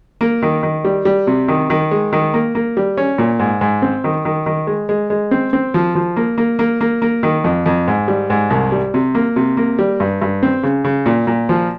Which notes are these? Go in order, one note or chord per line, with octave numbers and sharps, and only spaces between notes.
A#3
D#3
D#3
G3
G3
C3
D#3
D#3
G#3
D#3
A#3
A#3
G3
C#4
A#2
G#2
G#2
C4
D#3
D#3
D#3
G#3
G#3
G#3
C4
C4
F3
F3
A#3
A#3
A#3
A#3
A#3
D#3
F2
F2
G#2
G3
G#2
C2
G3
C3
A#3
C3
A#3
G3
G2
G2
C4
C#3
C#3
A#2
A#2
F3